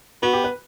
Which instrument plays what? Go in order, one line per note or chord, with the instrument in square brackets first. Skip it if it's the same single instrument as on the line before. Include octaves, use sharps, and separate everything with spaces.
[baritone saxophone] B3 [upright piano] F#4
[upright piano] G4
B4